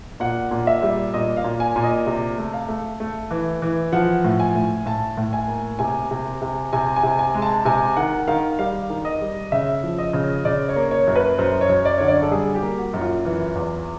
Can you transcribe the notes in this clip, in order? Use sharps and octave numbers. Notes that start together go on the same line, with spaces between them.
A#2 F#5
A#2
E5
G3
A#2 D#5
F5
A#2
G#5
A#2
D#5
C3
A3
F5
A3
A3
E3
E3
F3 F#5
A2
G#5
A2
A2 A5
A2
G#5
A#3
C3 G#5
C3
C3
C3 G#5
G#5
C3
G#5
G#3
A5
C3 G#5
D#3 F#5
D#3 F5
G3 F5
D#3
D#5
G3
C#3 E5
F3
D#5
C#3
C#3 D5
C#5
A#3
C#5
F#2
B4
F#2 C5
C#5
F#2
D5
D3 C#5
D5
A4
G3 G#4
G4
A#3
F#4
F#2
F4
E3
E2